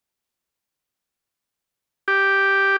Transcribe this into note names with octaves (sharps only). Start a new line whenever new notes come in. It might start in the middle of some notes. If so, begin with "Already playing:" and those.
G4